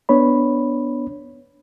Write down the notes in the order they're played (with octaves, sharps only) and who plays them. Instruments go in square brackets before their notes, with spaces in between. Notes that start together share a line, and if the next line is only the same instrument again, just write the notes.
[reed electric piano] B3 D4 C#5 B5